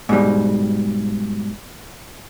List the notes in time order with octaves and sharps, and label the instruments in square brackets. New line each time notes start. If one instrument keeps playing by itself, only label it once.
[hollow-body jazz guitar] G#2 B2 G3